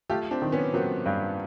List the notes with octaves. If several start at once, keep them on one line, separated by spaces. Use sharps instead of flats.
A3 F4 G4
C4 D4
D#3
B3 C#4
F#3 A#3 C4
G2